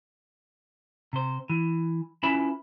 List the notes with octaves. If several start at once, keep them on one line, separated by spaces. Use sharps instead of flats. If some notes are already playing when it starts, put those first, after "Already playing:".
C3 C5
E3
C#4 E4 F4 B4 E5 B5